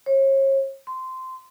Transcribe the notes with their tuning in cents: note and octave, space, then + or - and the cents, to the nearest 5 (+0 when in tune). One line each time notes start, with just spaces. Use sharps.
C#5 -40
C6 -15